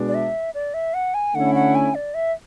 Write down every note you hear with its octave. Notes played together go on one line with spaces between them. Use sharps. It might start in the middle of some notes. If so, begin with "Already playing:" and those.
Already playing: B2 G#3 D4
D5
E5
D5
E5
F#5
G#5
D3 A3 C#4 E4 F#5
F#5
G#5
D5
E5